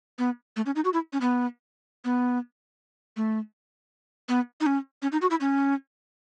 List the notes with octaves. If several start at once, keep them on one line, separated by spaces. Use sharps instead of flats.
B3
A3
C#4
D#4
F#4
E4
C#4
B3
B3
A3
B3
D#4
C#4
C#4
D#4
F#4
E4
C#4